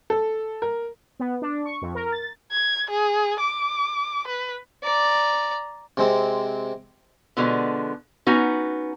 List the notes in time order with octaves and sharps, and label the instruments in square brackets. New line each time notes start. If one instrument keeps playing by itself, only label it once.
[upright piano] A4
A#4
[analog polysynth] B3
D4
C#6
F2
A#4
A6
[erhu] G#6
G#4
D6
B4
[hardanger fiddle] D5 A#5
[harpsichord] C3 G#3 C4
[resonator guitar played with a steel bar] B2 D3 F3 G#3 B3
B3 C#4 D#4 F#4